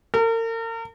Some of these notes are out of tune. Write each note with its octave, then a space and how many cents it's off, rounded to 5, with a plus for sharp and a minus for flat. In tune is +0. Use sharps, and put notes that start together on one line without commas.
A#4 -40